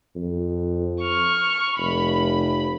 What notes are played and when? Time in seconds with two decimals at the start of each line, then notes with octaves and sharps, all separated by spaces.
0.16 F2
1.02 C#6 F6
1.78 F1 B5